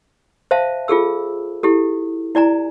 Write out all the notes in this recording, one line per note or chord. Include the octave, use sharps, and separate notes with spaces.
C5 E5 F5 A5
F4 G#4 A4 E6
E4 G4 A4
E4 D5 G#5 A#5